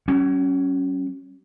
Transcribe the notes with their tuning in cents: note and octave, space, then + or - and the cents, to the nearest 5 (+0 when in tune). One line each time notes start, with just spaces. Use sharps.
F#3 +40 C#4 -5